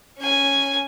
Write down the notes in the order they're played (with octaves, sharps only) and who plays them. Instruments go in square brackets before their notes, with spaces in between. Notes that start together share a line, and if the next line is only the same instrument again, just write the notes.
[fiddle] C#4 G#5